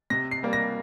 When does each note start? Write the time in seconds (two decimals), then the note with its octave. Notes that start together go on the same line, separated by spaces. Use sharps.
0.10 C3 A#6
0.31 C7
0.43 G3 A#3
0.53 A#6